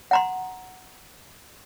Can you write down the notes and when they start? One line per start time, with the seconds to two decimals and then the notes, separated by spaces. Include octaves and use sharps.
0.11 F#5 A#5 C6